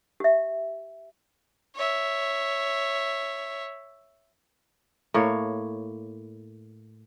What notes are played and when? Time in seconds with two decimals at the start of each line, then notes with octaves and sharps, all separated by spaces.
0.20 G4 E5
1.75 C#5 E5
5.14 A2 A#3 C#5